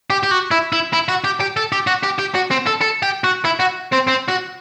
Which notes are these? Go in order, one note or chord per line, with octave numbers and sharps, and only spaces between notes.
G4
G4
F#4
E4
E4
E4
F#4
G4
G4
A4
G4
F#4
G4
G4
F#4
C4
A4
A4
G4
F#4
E4
F#4
C4
C4
F#4